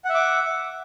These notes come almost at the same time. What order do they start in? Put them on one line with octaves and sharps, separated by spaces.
F#5 E5 D6